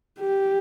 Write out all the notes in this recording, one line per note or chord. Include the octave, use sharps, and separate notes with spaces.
G4